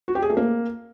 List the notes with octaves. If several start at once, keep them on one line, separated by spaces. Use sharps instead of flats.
F#4
G4
G#4
A3
A#3